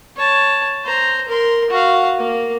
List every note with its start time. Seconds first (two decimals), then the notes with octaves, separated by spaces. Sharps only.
0.16 C#5 A5
0.84 C5 A#5
1.28 A#4 C6
1.70 F#4 F5
2.18 A#3